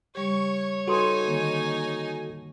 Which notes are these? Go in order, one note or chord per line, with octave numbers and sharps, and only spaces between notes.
C#3 G3 G4 C#5 C#6
D#4 F#4 A4 B4 G#5 C6 D#6
D3 D#3 A#3